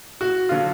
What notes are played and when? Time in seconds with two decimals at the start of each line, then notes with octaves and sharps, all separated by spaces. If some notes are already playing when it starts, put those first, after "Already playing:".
0.21 F#4
0.49 D3 F#3 F4